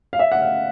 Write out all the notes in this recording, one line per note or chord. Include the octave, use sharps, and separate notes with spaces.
F5
E5
F#5
F5